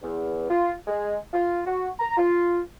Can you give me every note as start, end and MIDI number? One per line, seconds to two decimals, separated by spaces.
0.02 0.48 40
0.49 0.73 65
0.87 1.16 56
1.33 1.60 65
1.66 1.89 66
2.00 2.15 82
2.17 2.59 65